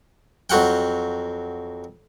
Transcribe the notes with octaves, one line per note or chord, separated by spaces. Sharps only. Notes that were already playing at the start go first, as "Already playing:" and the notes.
F2 F#3 F#5 G5